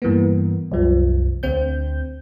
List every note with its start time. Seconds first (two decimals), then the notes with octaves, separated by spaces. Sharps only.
0.02 G2 E3 A#3 B3
0.72 C2 F#2 F3
1.43 D2 D3 C4 G6